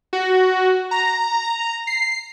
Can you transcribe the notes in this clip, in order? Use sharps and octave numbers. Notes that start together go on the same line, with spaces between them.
F#4
A#5
C7